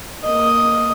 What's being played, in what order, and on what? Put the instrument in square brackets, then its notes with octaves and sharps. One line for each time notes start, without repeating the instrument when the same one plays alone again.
[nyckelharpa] A#3 D#5